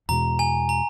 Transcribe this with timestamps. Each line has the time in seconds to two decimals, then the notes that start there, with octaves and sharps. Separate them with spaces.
0.09 E2 B2 G#3 A#5
0.39 G#5
0.69 A#5